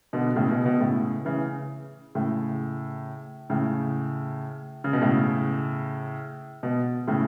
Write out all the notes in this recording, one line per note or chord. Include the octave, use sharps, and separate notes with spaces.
B2 D3
A2 C#3
B2
B2
A2 C#3
C#3 E3
A2 C#3
A2 C#3
C#3
B2
A2 C#3
B2
A2 C#3